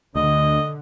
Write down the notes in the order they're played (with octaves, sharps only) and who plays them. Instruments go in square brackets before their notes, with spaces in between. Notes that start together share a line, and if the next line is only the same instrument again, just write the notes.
[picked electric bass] D2 [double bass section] D3 [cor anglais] D#5